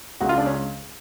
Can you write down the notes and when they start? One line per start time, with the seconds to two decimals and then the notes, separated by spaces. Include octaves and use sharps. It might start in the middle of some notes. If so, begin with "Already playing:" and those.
0.20 C#2 C#3 F#4
0.29 F4
0.38 D4
0.46 C#4